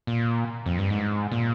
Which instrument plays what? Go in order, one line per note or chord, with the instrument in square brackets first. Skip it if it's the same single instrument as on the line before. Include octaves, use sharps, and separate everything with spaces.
[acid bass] A#2
F2
G2
G#2
A#2